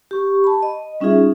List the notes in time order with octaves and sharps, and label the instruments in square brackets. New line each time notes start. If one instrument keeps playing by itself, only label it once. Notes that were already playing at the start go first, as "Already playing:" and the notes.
[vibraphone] G4 C#6
A5 B5
D#5
G3 C#4 D#4 F4 G#4 E5